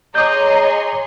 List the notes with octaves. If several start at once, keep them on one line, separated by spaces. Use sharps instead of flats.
G#4 C#5 D#5 A#5 C6 D6 D#6 G6